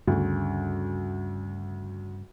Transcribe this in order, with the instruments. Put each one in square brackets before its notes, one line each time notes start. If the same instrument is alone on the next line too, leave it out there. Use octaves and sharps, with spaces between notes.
[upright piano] D2 [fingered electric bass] G2 C#3